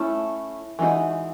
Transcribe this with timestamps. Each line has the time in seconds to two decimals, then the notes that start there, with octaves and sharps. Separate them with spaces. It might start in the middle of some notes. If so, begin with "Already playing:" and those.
Already playing: A3 C#4 E4
0.79 E3 G#3 B3 D#4 F#4